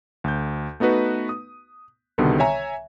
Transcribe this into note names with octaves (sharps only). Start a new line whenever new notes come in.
D2 G6
A3 B3 D#4 F#4 B4
D#6
C2 B2 D3 D#3 G3 B3
C#5 E5 G#5 A#5